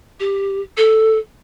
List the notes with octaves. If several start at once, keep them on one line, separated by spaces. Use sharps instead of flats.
G4
A4